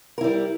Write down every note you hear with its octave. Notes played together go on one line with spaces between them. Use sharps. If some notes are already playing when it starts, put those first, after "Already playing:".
G3 E4 A#4